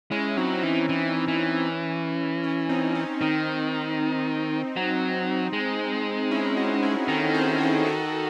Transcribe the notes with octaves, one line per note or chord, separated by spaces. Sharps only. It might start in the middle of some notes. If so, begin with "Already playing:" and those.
G#3 C#4 E4
F#3 C4 D#4
D#4
E3 C#4
E3 C#4
E3
C#4
C4 D#4
C#4
D#3 C4 D#4
F#3
G#3
C#4 E4
D#4 F#4
E4 G#4
D#3 F#4 A4
G#4 C5
F#4 A4
F#4 A4